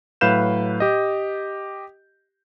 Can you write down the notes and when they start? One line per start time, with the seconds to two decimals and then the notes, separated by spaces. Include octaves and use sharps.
0.21 A2 F#3 B4 F5 G6 E7
0.80 G4 D#5